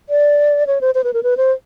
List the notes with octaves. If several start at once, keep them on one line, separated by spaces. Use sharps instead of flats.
D5
C#5
C5
C5
B4
A#4
B4
C5